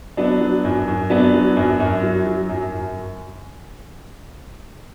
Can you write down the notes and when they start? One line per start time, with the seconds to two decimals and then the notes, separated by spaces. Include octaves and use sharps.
0.17 F#3 B3 D4
0.41 F#3
0.65 F#2
0.88 F#2
1.10 F#3 B3 D4
1.34 F#3
1.57 F#2
1.80 F#2
2.03 F#3
2.27 F#3
2.50 F#2
2.72 F#2